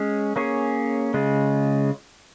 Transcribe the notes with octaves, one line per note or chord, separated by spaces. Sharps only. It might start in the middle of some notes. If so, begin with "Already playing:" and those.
Already playing: G#3 C#4 G#4 C#5
A#3 C#4 G#4 C#5
C#3 G#3 F4